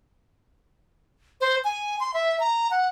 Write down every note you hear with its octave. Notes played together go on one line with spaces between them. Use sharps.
C5
G#5
C6
E5
A#5
F#5